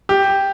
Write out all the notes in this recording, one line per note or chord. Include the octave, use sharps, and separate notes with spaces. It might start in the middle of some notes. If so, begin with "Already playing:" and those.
G4